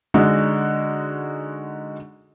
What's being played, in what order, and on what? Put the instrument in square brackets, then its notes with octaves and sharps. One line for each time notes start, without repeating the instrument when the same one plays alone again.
[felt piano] D3 G#3 D#4 F#4